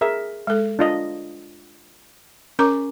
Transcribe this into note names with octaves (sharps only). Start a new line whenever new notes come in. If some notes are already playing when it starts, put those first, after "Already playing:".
G#4 A#4 E5
G#3 A4
D4 F4 D#5
C#4 A#4 A#5 D6